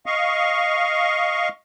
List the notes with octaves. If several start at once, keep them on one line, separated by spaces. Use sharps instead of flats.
D#5 F5 C#6